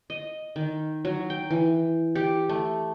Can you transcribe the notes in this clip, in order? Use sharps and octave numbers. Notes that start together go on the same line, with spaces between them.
D#5
D#3
F#3
G5
E3
G4
A3